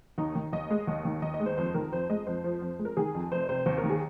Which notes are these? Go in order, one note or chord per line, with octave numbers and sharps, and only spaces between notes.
D#2 D#4
D#3
D#2 D#5
G#3
D#2
D#3
D#2 D#5
D#5
G#3
C5
F2 C5
D#3 A#4
F2 C5
G#3 D#5
F2 C5
F3
F2
G#3
A#4
D#3 G#4
F2
F1 C5
C3 C5
D#2 C5
A#4
D#3
G#4